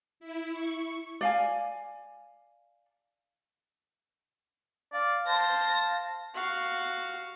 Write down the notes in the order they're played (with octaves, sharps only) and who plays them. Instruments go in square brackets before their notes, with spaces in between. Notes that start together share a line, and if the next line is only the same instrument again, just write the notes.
[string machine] E4
C#6
[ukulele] D5 F5 G#5
[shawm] D5 [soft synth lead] F5
[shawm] C5 [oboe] A5 [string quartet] A#6
[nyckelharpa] F#4 F5